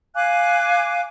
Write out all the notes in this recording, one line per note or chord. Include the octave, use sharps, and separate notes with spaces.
F5 G#5 D6 F#6